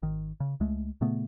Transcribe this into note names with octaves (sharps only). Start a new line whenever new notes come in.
G#1 D#3
C#3
C#2 G#3 A3
A#2 C#3 A3 B3